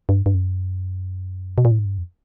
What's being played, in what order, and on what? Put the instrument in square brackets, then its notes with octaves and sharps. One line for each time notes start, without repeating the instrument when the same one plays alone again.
[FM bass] G2
G2
F#2
B2
A#2
A2
G#2
G2
F2